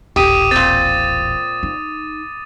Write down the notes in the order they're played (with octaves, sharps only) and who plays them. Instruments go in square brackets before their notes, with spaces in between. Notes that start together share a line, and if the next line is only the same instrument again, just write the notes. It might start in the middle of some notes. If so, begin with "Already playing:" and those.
[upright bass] D#1 A1 [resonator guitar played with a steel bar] G4 [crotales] D6 D#6 D#7
[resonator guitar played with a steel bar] A#2 C4 [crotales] A6
[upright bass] D#4